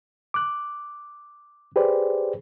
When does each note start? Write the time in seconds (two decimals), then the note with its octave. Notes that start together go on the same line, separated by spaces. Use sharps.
0.34 D6 F#6
1.76 G4 G#4 B4 C5 D5